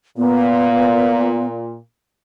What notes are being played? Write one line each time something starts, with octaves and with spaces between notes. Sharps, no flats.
A#2 B3